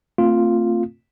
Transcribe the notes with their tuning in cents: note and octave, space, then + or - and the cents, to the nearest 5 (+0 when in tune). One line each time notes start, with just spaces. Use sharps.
A3 +45 C4 +5 F4 +0